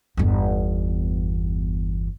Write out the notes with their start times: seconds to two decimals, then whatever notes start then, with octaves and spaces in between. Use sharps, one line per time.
0.17 G1 E2